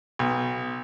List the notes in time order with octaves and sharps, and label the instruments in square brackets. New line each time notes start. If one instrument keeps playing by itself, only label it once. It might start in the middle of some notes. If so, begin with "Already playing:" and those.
[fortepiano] B1